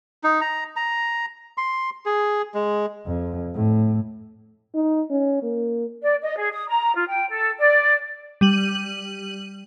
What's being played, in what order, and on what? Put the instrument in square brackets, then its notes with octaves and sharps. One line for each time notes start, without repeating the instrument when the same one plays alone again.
[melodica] D#4
A#5
A#5
C6
G#4
G#3
[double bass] F2
A2
[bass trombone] D#4
C#4
A#3
[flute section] D5
D#5
G#4
D#6
A#5
F4
G5
A4
D5
[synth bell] G3 D#7 F#7